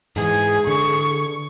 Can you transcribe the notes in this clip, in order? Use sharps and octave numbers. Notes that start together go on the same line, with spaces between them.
G#2 E3 G#4 G#5
D3 C#6